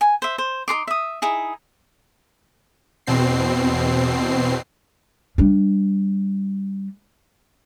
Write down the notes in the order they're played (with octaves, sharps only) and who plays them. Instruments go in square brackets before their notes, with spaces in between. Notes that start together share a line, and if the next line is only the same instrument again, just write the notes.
[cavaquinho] G#5
C5 E5
C5
D#4 A#4 C6 D6
E5 D#6
D#4 E4 G#4
[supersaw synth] E2 B2 C4 C7
[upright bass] G3 D4